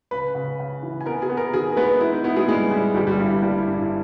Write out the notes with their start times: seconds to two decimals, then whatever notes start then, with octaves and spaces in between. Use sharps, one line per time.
0.11 C#2 B4 B5
0.35 C#3
0.59 C#3
0.83 E3
1.01 G#5
1.06 B3 A#4 A#5
1.22 G#4 G#5
1.29 B3
1.37 A#4 A#5
1.53 D#3 G#4 G#5
1.72 A#4
1.77 G#3 B3 B4
2.01 B3 E4
2.12 D#4
2.24 B3 E4
2.36 G#3 G#4
2.48 G3 G#3 G#4
2.71 G3 E4
2.95 G1 G3 G4
3.07 G3 G4
3.19 G2 E4
3.42 G3 A#3 G4
3.58 E4
3.67 G2
3.74 E4